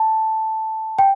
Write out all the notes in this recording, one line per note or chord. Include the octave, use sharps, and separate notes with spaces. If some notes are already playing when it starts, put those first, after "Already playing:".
Already playing: A5
G5